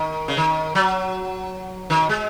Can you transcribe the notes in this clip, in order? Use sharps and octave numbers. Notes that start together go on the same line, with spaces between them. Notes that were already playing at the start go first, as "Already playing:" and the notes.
Already playing: D#3
C#3
D#3
F#3
D#3
G#3